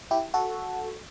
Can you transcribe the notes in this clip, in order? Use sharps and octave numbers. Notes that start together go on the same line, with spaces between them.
E4 G4
F#4 A4